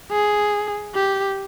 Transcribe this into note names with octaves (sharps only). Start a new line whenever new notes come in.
G#4
G4